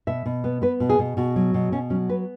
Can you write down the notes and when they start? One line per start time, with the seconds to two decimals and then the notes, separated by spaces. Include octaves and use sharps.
0.07 B2 E5
0.26 B2
0.44 B3
0.62 B3 B4
0.80 B2
0.89 G#4
0.99 B2
1.17 B2 F#4
1.36 F#3
1.54 B2
1.72 B2 C#4
1.90 F#3 C#4
2.09 B3 B4